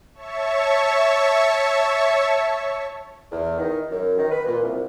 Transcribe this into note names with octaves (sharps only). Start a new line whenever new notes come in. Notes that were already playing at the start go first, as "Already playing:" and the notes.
C#5 E5 A5 C#6
E2
D#3
F#2
D#3
B4
A#2
C2